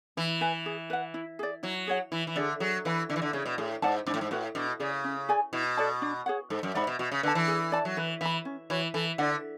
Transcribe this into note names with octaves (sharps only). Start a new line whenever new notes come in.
E3 E4
B4 E5 G#5
G#4
B4 F#5
E4
G#4 D5
F#3 E4
G#4 C#5 F#5
E3 E4
E3
D3 G#4 D5
F#3 G#4
E3 B4 E5 B5
D3 E4
E3
D3
C#3 G#4 C#5
B2
A2 G#4
G#2 D5 F#5 A5
G#2 D4
A2
G#2
A2 F#4 B4 F#5
B2 D4
C#3 G#4 D5
C#4
G#4 D5 G#5
B2 E4
A4 D5 A5
D4
G#4 C#5 F#5
G#2 A4
F#2
G#2 D5 F#5 B5
B2
B2 F#4
C#3
D3 B4 E5 A5
E3
G#4
D5 A5
F#3
E3 B4
E3 E5 B5
C#4
E3 F#4 C#5
E3 A4
D3 D5 F#5